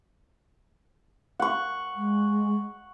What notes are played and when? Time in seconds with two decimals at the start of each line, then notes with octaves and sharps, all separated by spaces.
1.40 F#5 C#6
1.96 G#3